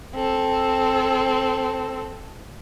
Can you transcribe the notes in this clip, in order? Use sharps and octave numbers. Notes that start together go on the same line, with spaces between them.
C4 A4